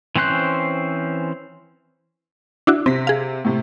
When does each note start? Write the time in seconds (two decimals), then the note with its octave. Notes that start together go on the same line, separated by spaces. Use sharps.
0.16 E3 C4 C#4 C5 F#6
2.67 D4 E4 F#4
2.86 C3 C4 A#6 B6
3.07 G#4 F5
3.45 A2 C3